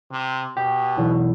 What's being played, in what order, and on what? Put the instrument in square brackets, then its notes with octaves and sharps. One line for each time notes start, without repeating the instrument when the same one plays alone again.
[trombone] C3
[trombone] B2 [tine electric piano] G4
[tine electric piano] B1 E2